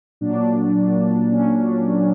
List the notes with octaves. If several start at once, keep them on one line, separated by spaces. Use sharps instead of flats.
A#2 F#3 D4
A#2 F#3
A#2 F#3 C#4
D4
A#2 F#3